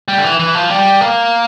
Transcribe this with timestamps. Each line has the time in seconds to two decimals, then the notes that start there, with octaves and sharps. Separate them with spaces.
0.08 G3
0.18 D3
0.24 E3
0.39 E3
0.55 F3
0.70 G3
1.01 A#3